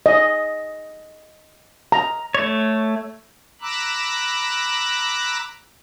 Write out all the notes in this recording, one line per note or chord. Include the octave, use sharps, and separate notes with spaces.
D#5
A#5
A3 C#5
A#5 B5 D6 E6 F#6